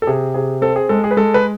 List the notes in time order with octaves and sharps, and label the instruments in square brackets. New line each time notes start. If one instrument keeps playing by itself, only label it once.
[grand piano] A4
C3 G#4
C3 G#4
C4 A4
G#4
G#3 A4
G#4
B4
G#3 A4
B4